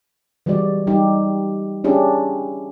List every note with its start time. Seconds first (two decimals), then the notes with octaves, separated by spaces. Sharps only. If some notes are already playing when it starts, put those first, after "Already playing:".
0.46 E3 G3 G#3 F#4 D5
0.87 G3 D#4 G4
1.84 C#4 D4 E4 G4 G#4